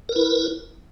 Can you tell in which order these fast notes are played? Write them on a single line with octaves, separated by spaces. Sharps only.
A#4 B4 E4